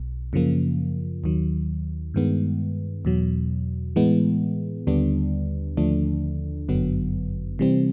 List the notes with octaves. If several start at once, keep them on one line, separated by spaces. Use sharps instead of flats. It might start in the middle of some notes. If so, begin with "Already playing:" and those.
Already playing: B1 B2
F#2 C#3 F3 A#3
D#2 D#3 F#3
G2 D#3 G#3 B3
E2 B2 F#3
A2 E3 G#3 B3
D#2 D3 G3 B3 D4
D#2 D3 F3 A3 D4
G1 F#2 D3 F#3 B3
C3 E3 G3 C4